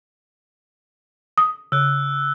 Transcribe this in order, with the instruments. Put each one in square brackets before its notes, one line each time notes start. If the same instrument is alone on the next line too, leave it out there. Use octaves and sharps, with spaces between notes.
[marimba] D#6
[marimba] C#3 [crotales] E6 F#6